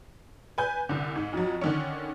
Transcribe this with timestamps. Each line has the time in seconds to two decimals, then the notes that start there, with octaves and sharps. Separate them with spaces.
0.58 B4 G#5 G6
0.89 C2 D3
1.16 G#2
1.33 F2 F#3
1.61 D3 D#3 C#4